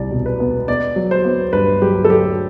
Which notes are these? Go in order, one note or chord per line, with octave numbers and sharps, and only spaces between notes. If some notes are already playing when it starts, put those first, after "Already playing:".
Already playing: C2 D5
B2
B4
B3
B3 D5
F#3
C5
B3
G2 B4
F#3 G4
A4
F#3 G4